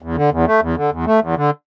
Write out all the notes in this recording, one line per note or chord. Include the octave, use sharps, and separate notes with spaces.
E2
D3
E2
A3
E2
D3
E2
A3
E2
D3